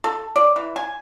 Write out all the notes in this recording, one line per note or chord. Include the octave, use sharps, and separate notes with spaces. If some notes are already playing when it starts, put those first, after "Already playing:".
A4
D5
E3
G#5